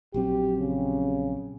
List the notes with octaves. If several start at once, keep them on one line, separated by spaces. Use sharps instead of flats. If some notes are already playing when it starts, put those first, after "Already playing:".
A#1 F#3 C4 G4
C#3